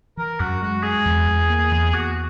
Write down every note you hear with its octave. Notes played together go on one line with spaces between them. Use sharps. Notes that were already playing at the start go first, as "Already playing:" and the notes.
E3 A#4
F#2 F#4
G#3 F#4
G#3 G#4
E2
E2
A#3
E2
E2 F#4